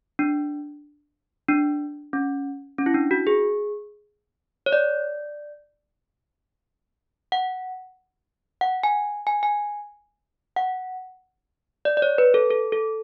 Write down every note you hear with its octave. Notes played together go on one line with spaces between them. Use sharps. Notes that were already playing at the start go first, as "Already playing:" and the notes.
D4
D4
C#4
C#4
E4
D4
F#4
G#4
C#5
D5
F#5
F#5
G#5
G#5
G#5
F#5
D5
D5
C#5
B4
A4
A4
A4